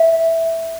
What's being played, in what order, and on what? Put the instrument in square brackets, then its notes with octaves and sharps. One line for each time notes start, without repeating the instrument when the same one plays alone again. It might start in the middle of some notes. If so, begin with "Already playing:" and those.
Already playing: [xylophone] E5